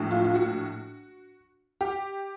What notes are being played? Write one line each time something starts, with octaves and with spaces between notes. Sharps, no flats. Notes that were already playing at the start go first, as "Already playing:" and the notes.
Already playing: A#1 A2 F#3
F4
F4
F#4
G4